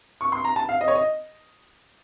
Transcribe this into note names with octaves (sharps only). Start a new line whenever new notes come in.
C#6
C6
A#5
A5
F5
D#5
C#5
D#5